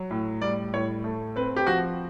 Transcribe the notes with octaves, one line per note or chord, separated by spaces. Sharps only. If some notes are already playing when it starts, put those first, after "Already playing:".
Already playing: F#3
A2
G3 D5
A2 C#5
A3
C4 B4
G4
F3 F#4